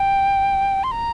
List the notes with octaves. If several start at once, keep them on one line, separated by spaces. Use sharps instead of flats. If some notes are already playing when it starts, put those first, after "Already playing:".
Already playing: G5
C6
A#5